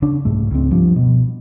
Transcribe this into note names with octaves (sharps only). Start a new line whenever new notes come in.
C#3 C#4 D4
C2 G#2 A3
C#2 C4
G2 F3
B2